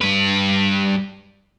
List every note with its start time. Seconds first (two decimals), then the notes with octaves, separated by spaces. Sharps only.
0.01 G2 B4